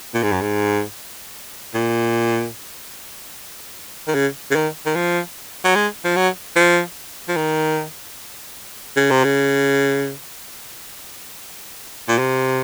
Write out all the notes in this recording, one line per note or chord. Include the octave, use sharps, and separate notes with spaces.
A#2
G#2
F#2
G#2
A#2
D#3
C#3
C#3
D#3
D#3
F3
F#3
G#3
F3
F#3
F3
F3
D#3
C#3
C3
C#3
A#2
C3